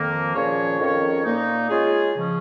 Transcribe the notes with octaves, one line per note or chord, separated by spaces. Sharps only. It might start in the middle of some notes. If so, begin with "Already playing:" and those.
Already playing: F2 D#3 A#3
A#2 F3 C#4 G#4 C#5
F2 D#3 C#4 A#4 C#5
A#2 A#3 D#4
G#3 C#4 F4 G#4
C#3 F3 C#4